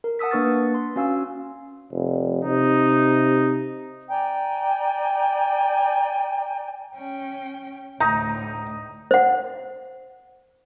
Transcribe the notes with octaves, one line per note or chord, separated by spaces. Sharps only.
A#4
F#5 A5 D#6 E6 B6
A#3 D4 B4 C#6 F6 A6
C6
C#4 F#4 F5 G#5 E6
F1
C3 D#4
D5 G5 G#5 A#5
C#4 G5
D2 A2 D#4 A#5
C5 F#5